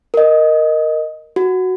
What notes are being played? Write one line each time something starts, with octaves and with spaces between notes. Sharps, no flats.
A#4 D#5
F#4